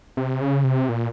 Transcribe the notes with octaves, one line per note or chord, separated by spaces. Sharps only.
C3
C#3
C3
A#2